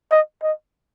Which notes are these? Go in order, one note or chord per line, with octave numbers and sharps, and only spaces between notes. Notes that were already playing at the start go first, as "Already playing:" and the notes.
D#5
D#5